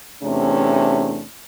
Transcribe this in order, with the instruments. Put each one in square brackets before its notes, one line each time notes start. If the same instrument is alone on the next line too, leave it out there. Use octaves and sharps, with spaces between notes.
[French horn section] E2 C3 A3 C#4 D4